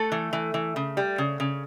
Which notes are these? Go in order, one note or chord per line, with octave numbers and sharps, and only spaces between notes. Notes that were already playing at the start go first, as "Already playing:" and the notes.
Already playing: A3 A4
E3
E3
E3
C#3
G3
C#3
C#3